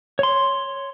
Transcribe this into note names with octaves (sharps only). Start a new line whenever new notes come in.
C#5 C6